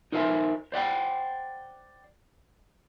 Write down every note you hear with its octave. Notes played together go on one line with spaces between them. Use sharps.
D#4 A#4 C5 E5 G#5
C5 D5 F#5 G5